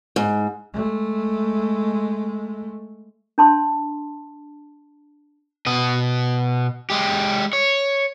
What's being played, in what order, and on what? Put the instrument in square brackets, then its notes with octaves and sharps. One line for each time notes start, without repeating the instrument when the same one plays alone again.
[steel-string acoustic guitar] G#2
[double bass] G#3 A3
[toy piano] D4 A5 C6
[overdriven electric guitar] B2 D#5
G#3 G4
C#5